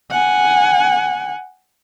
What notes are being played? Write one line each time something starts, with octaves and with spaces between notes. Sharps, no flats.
F#5 G#5